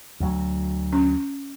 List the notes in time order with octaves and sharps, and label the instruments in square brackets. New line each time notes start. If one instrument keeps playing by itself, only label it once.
[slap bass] D2 F#3
[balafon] C#4